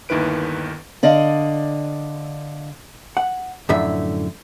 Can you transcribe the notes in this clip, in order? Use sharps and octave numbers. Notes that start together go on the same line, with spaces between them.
G1 D#2 D#3 E4 B4 D7
D3 D5 D#5 F5
F#5
F#2 A2 D3 F3 E5